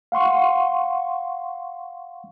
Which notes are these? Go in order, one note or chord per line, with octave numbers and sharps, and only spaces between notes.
F5 F#5 C6 C#6